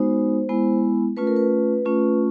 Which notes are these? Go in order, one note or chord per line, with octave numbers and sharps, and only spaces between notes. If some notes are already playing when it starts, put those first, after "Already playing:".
Already playing: G#3 B3 D#4 F#4 C5
G#3 B3 E4
A3 C#4 F4 B4
A#4
B4
A3 C#4 F4